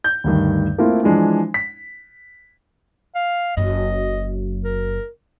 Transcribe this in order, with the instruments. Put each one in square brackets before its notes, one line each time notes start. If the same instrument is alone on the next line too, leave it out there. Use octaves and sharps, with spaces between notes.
[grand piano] G6
D2 G2 D#3
A3 A#3 C4 E4 F4
E3 F3 G#3 D4
B6
[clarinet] F5
[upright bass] F#1 F#2 [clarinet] D#5
[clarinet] A#4